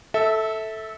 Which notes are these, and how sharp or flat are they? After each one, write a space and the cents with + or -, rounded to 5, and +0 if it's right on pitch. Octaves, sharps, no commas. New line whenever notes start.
A4 +0 E5 -20